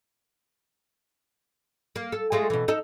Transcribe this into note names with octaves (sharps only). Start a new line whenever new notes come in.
A#3
A4
G#3 A3 F4
B2 E3
D#4 A4